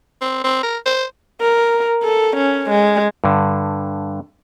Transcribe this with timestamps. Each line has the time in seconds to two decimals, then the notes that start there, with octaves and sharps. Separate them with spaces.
0.21 C4
0.44 C4
0.63 A#4
0.86 C5
1.41 A#4
2.04 A4
2.36 C#4
2.70 G#3
3.24 G2 D3